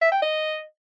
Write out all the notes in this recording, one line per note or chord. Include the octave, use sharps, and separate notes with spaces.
E5
G5
D#5